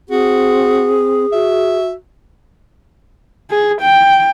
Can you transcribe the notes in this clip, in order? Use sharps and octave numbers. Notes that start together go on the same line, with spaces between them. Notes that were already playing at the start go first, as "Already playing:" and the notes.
C4 F#4 G#4
F#4 E5
G#4
G5